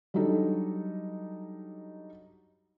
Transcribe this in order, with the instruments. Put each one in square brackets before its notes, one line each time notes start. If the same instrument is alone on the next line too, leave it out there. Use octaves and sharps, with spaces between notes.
[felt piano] F#3 G3 D4 D#4 A4